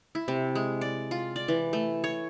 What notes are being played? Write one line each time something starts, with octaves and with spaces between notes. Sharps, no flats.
E4
C3
G#3
D5
F4
D5
E3
A3
C#5